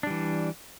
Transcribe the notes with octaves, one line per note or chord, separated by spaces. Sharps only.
E3 G3 D4